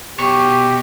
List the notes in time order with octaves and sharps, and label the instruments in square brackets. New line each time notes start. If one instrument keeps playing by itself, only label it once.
[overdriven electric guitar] B2 C#5 [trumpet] G4